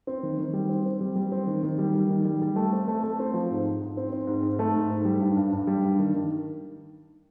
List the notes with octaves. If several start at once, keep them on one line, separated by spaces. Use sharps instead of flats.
C4
D#3
D#3
G3
C4
C4
G3
G3
C4
D#3
D#3
G3
G3
D#3
G3
G3
A3
C4
A3
A3
C4
F3
G#2
G#2
G#2
C4
C4
G#2
G#2
A3
G#2
G#2
G3
G2
G2
G2
G3
G2
D#3
D#3